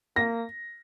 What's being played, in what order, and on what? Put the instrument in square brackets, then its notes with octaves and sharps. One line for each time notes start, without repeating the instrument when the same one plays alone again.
[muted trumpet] A#3 [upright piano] A#6